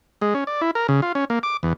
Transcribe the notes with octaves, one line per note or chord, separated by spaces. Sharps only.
G#3
C#4
D5
E4
A#4
C#3
F4
C#4
A#3
D6
E2